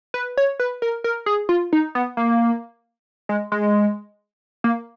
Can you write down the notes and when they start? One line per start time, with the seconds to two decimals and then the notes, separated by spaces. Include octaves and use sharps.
0.14 B4
0.37 C#5
0.60 B4
0.82 A#4
1.04 A#4
1.26 G#4
1.49 F4
1.73 D#4
1.95 B3
2.17 A#3
3.29 G#3
3.52 G#3
4.64 A#3